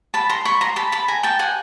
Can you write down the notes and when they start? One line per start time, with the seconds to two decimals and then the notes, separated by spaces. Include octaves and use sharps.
0.14 A5 B5
0.29 A#5 C6
0.45 B5 C#6
0.61 A#5 C6
0.76 A5 B5
0.92 A5 B5
1.08 G#5 A#5
1.23 G5 A5
1.39 F#5 G#5